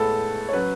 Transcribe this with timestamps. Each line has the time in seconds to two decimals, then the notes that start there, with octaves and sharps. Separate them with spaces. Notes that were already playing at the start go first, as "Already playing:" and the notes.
Already playing: A2 G#3 B3 A4
0.49 C#5
0.53 F#3 C#4 B4